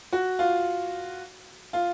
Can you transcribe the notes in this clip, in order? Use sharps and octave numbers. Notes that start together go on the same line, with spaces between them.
F#4
F4
F4